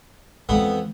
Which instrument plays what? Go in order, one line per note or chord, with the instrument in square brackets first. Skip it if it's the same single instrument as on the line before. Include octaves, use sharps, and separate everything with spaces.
[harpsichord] F2 B3 [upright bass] E3 G#3